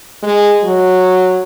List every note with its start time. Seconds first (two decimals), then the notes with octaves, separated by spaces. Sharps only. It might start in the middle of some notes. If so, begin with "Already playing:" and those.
0.23 G#3
0.64 F#3